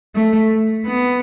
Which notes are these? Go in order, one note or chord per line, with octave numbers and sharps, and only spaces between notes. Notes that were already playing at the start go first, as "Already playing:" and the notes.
A3
B3